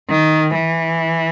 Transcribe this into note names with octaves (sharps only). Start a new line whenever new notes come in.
D#3
E3